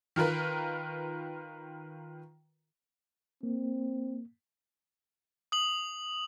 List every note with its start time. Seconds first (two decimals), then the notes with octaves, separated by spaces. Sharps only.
0.16 D#3 F4 A#4 B4
3.43 A#3 C4
5.52 D#6 F#7